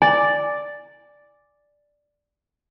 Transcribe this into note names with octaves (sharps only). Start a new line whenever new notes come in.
D5 G#5